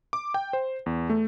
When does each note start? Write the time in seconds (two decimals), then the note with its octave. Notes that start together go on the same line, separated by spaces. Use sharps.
0.13 D6
0.34 G5
0.53 C5
0.86 E2
1.10 A3